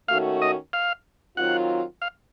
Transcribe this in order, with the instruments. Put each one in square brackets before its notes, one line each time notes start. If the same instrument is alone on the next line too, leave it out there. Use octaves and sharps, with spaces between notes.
[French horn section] D#2 D#3 A3 C#4 F#4 [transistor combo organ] F5
[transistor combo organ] D#5
F5
[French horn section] D#3 F#3 C4 F4 [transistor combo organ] F#5
[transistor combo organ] F5